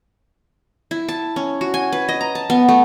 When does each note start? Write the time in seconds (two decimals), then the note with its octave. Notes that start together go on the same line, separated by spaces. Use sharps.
0.91 E4
1.09 A5
1.36 C#4
1.61 F#4
1.74 G#5
1.93 B4
2.09 D#5
2.21 A#5
2.35 A5
2.50 B3
2.69 A3